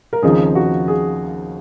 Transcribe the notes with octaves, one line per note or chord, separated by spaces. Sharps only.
A#4
D#2 C#3 F3 C4 D#4 G#4
F#4
G#4